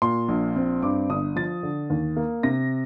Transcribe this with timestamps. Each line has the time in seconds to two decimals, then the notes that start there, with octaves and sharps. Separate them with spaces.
0.02 A#2 C6
0.29 A#1
0.56 C4
0.83 G2 D6
1.10 G1 D#6
1.36 F3 A6
1.63 D3
1.90 D#2
2.17 A#3
2.43 C3 A#6